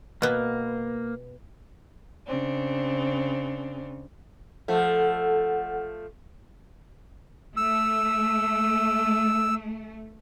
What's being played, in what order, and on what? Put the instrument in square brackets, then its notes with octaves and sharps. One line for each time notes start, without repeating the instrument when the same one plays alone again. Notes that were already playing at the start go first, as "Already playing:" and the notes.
[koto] B2 B3 [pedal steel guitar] A#3
[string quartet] C#3 C4 D4
[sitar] F3 A3 [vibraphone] A4 F#5
[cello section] A3 [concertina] E6